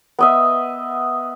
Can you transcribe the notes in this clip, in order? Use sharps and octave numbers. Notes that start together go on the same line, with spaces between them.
B3 D#5 E5